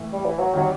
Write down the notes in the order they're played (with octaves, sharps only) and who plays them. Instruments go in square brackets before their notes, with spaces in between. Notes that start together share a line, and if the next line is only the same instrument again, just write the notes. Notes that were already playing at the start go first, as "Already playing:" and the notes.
Already playing: [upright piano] A2 E3 A3
[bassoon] G3
E3
F#3
[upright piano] D#3 G3 [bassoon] F#3